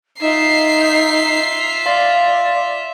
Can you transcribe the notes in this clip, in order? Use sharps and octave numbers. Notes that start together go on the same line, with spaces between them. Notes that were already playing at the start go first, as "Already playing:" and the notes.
D#4 F4 E5 C7
D5 F5 C6 A6